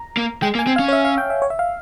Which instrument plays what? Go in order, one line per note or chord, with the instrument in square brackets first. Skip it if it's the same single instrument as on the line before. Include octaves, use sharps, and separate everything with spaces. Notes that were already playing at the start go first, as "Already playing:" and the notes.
Already playing: [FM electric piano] A#5
[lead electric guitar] A#3
[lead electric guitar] G#3 [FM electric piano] G5
[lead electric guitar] A#3
[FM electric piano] G#5
[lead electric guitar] C4
[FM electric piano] F5
[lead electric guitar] C#4
[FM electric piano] C#5
E5
F5
G5
E5
C#5
E5
F5